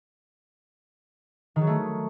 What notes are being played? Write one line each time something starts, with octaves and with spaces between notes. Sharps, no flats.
D#3
F#3
A3